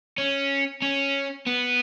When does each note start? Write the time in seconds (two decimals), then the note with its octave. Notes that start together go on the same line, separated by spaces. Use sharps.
0.18 C#4
0.82 C#4
1.47 B3